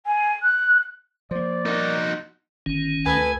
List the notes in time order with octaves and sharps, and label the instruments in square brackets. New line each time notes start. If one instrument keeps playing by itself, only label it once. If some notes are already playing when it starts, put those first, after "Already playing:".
[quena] G#5
F#6
[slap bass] F3 A#3 [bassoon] C5 [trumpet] D5
[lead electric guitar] D#4 F#4 [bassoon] A#4
[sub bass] G1 [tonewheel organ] D#3 C#4
[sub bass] D2 [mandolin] B3 A4 B4 [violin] G#5